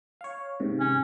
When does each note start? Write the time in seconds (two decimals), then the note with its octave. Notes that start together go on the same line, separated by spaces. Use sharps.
0.21 C#5 F5
0.60 G#2 C3 D#3
0.80 C#4